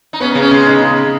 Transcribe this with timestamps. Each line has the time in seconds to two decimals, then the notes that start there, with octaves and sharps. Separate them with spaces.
0.13 D#4
0.20 B3 C#4
0.31 D#4
0.35 C#3
0.41 C#4
0.51 C#3 G#3
0.67 D#4
0.82 C#3